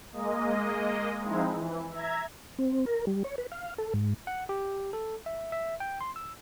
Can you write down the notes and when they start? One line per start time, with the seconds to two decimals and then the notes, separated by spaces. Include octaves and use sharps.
0.12 G#3 A#3 D#5
1.21 F3 G#3 C4 D#4 E4
1.53 E3
1.91 E5 A#5 G#6
2.59 C4
2.86 A#4
3.07 G3
3.24 C#5
3.38 B4
3.52 F5
3.78 A4
3.94 G#2
4.27 F#5
4.49 G4
4.93 A4
5.26 E5
5.52 E5
5.80 G5
6.01 C6
6.16 E6